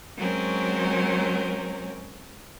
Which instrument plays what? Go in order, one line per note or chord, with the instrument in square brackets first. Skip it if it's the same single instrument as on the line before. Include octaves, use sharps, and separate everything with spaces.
[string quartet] F#3 G#3 C4 C#4 A#4